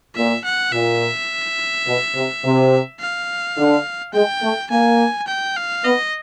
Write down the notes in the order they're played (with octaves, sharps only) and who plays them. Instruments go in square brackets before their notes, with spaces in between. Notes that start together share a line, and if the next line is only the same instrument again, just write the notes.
[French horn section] A#2 [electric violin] E5
[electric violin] F#5
[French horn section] A#2 [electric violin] E5
[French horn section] B2
C3
C3
[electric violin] F5
[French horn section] D3
[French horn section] G#3 [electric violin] G5
[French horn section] A3
[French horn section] A#3 [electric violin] G#5
[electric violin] G5
F5
[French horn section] B3 [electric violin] D#5